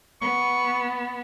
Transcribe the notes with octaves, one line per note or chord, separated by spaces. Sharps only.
B3 C#6